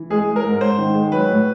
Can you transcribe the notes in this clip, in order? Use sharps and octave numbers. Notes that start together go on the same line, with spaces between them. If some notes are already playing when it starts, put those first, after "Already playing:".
Already playing: E3
G#3 G#4
G#3
A#4
G#2
G#2 C5
D#3
G#3
F#3 B4
A2